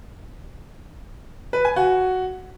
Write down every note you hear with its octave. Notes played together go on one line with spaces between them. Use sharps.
B4
G#5
F#4